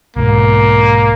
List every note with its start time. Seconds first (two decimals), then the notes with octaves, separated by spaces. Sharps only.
0.16 B1 G#2 A#3